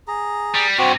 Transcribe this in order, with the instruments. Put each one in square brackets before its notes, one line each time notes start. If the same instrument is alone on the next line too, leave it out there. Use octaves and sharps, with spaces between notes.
[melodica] G#4 A#5
[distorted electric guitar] G3
[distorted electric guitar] G2 C3 [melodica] C4 F#4